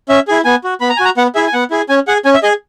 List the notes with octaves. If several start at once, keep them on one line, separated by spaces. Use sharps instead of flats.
C#4 E5
E4 G#4
B3 G#5
F#4
B3 B5
A#5
G#5
F#4
A#5
B3 F#5
E4 G#4 E5
G#5
B3 F#5
E4 G#4
C#4 G#5
G#4 F#5
C#4 G#5
E5
G#4 D#5